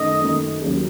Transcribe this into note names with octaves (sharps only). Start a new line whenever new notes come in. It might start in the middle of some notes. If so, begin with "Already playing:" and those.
Already playing: F#2 D#3 A3 D#4 D#5
F#2 D#3 A3 D#4
D#2 C#3 F#3